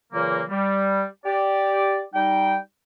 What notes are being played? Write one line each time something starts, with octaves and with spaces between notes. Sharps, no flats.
A#2 C#3 E3 F#3 A#3
G3
G4 D5
G3 D#4 G5